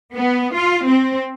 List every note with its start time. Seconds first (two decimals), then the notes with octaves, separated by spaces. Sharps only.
0.15 B3
0.54 F4
0.84 C4